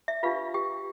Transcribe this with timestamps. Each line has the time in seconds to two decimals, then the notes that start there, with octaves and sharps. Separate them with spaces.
0.08 E5
0.23 D4 F4 G4 B4 F5
0.54 G4 G5